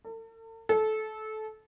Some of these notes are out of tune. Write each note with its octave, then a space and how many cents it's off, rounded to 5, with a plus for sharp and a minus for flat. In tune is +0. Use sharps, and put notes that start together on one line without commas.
A4 +40
A4 -20